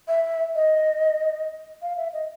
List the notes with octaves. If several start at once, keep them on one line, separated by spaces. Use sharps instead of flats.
E5
D#5
F5
E5
D#5